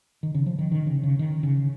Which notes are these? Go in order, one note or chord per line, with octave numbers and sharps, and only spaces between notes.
D#3
C#3
F3
D#3
D#3
C#3
C#3
D#3
C#3